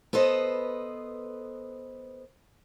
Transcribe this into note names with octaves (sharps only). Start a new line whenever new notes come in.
B3 A4 B4 C5 D#5